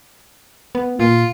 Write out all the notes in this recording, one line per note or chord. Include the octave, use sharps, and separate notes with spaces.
B3
A#2 F4